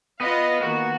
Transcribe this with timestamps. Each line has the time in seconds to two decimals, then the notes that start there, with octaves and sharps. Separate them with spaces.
0.21 B3 F4 B4 D#5 F5
0.63 D#3 A#3 B3 F#4